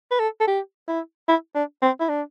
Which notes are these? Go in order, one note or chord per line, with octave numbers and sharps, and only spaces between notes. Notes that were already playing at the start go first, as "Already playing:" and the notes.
B4
A4
A4
G4
E4
E4
D4
C4
E4
D4